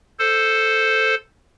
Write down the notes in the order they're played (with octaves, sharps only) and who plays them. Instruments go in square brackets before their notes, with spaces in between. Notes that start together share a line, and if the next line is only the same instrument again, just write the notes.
[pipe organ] A4 C5